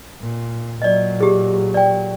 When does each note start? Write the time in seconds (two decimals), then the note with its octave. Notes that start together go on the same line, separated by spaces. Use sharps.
0.21 A#2
0.82 A#2 F#3 D5 D#5
1.20 G4 G#4
1.74 D5 G5